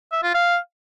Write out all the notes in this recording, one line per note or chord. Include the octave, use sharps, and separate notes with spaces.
E5
F4
F5